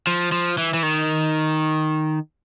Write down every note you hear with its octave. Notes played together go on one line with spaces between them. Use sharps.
F3
F3
E3
E3
D#3